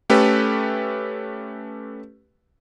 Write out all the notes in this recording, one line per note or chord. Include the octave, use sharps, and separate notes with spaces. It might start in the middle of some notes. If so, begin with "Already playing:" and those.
A3 C#4 G4 A4 B4